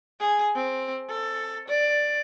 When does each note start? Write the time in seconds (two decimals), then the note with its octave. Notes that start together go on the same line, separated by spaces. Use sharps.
0.20 G#4
0.56 C4
1.09 A4
1.68 D5